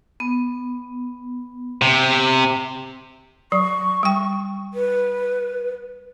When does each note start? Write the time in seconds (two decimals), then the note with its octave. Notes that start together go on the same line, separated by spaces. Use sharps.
0.20 B3
1.82 C3
3.52 F#3 C#6
4.03 G3 G5
4.74 B4